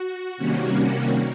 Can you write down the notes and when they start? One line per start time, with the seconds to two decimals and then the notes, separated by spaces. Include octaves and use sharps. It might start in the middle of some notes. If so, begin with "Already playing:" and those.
Already playing: F#4
0.37 C3 D#3 G3 A#3 C#4